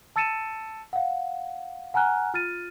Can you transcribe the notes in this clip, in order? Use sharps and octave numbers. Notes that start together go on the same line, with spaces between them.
A5 E6 A6 C#7 D#7 E7
F5 F#5
F#5 G#5 A#5 F6 F#6
F4 F6 A6 D#7